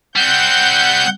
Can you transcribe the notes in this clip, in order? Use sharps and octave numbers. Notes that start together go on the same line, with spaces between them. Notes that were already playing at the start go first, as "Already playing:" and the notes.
G3 C4 F#5 G6